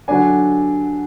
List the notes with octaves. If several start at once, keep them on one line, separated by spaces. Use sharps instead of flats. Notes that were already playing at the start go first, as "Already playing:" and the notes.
D3 F#3 D4 G#5